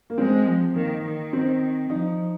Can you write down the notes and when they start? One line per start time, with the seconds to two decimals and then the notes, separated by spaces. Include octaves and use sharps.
0.10 A#3
0.18 G#3 C4
0.47 F3
0.75 D#3 A#3
1.05 D#3
1.33 C4
1.90 F3 D#4